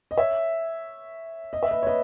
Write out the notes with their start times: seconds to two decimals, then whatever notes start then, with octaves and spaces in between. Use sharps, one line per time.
0.11 D#5
0.18 C#5 E5
1.53 D#5
1.63 E5
1.71 B4 D#5
1.83 C#5
1.87 B4 D#5